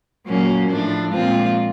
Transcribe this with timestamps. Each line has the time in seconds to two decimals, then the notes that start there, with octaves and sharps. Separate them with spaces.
0.26 A#2 F#3 A#3 C#4
0.69 A2 F3 A3 D4
1.13 A#2 F3 G#3 C4 F4